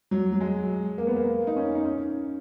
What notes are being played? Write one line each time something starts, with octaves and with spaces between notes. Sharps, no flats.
F#3
F#3
G#3
A#3
B3
A#3
D#4
C#4
D#4
C#4